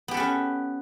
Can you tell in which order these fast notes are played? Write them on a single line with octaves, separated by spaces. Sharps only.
B3 G4 A4 B4 C#4